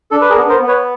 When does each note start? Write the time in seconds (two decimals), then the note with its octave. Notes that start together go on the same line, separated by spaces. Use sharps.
0.11 D4 A4
0.21 B4
0.30 G#4 A#4
0.37 B3
0.49 A#4 C5
0.62 B3
0.68 B4 C#5